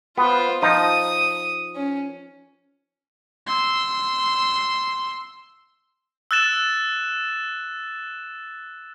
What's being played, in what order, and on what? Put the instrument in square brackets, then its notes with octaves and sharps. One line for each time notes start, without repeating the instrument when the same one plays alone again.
[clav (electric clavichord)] B3 [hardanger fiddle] F4 C5
[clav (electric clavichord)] F3 D#4 [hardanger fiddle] D#6
[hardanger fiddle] C#4
[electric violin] C6 E6
[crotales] E6 F#6 A6 E7